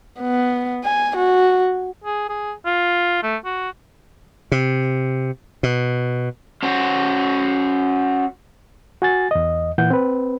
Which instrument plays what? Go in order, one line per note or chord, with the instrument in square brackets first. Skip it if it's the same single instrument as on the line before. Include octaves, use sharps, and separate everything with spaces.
[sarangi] B3
G#5
F#4
[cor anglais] G#4
G#4
F4
A3
F#4
[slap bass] C3
B2
[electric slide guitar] C#4 F#4 C5
[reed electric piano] F#4 G#5 A6
E2 D#5
A#2 E3 F#5 G6
C4 B4